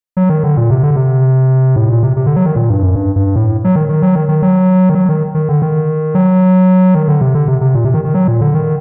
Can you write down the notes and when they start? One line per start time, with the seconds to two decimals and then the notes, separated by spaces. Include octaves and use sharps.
0.17 F#3
0.29 D#3
0.43 D3
0.57 A#2
0.70 C3
0.83 D3
0.96 C3
1.76 A2
1.90 A#2
2.03 C3
2.17 C3
2.26 D3
2.36 F#3
2.46 D#3
2.56 A#2
2.69 G2
2.83 F#2
2.95 G2
3.16 G2
3.36 A2
3.64 F#3
3.76 D#3
3.89 D#3
4.02 F#3
4.15 D#3
4.29 D#3
4.42 F#3
4.89 D#3
4.95 F#3
5.09 D#3
5.35 D#3
5.49 D3
5.62 D#3
6.15 F#3
6.95 D#3
7.08 D3
7.21 C3
7.35 D3
7.48 C3
7.61 C3
7.75 A#2
7.85 C3
7.94 D#3
8.04 D#3
8.14 F#3
8.28 A#2
8.41 D3
8.54 D#3